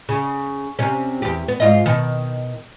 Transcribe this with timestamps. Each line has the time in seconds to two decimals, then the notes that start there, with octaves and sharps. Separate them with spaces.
0.09 C#3
0.79 C3 C#4
1.22 E2 G4
1.48 B3
1.60 G#2 F4 D#5
1.86 B2 D#3